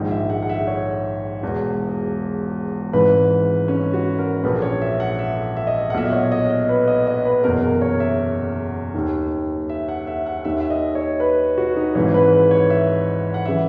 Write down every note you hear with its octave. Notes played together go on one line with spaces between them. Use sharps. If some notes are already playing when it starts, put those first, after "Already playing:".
Already playing: A#1 G#2 D#3
E5
F#5
F#5
E5
C#5
E1 E2 B2
G#1 G#2 E3 B4
C#4
F#4
A#4
A#1 A#2 B4
C#5
E5
F#5
E5
E5
D#5
E5
F#5
B1 A#2 E5
D#5
C#5
D#5
D#5
B4
D#5
D#5
B4
F#1 E2 B2 A#4
A#4
C#5
E5
D#2 D#3
E5
F#5
E5
F#5
D#2 D#3 E5
E5
D#5
C#5
B4
F#4
D#4
G#1 G#2 E3 C#5
B4
B4
C#5
E5
F#5
C#3 E3 E5